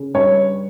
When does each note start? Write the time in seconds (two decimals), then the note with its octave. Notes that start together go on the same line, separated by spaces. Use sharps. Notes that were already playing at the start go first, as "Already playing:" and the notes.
Already playing: C#3
0.14 G2 C#5